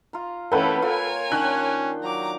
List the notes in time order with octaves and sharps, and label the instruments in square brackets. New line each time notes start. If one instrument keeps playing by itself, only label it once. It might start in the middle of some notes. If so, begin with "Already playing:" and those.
[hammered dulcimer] F4 A#5
[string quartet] E3 A3 C#4 [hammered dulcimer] A#3 G5 [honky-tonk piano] A4 B4 F#5
[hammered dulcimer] F4 [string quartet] A#4 C#5 G#5
[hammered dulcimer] D#3 D4 G5 [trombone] C#4 [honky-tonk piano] F#6
[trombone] F#3 [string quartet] A#5 D6